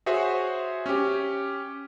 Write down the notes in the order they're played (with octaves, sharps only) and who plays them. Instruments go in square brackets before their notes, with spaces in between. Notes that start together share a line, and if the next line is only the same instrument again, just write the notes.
[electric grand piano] F#4 G#4 C5 C#5 E5
C#4 G4